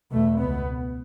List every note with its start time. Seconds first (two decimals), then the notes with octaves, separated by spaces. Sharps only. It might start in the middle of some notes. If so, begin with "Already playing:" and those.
0.11 E2 B2 A3
0.39 C#2 B2 B3